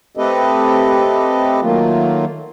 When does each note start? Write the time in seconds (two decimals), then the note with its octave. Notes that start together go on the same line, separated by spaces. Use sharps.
0.17 A3 C4 G4 A4 B4 D#5
1.61 D#3 F#3 A3 A#3 F4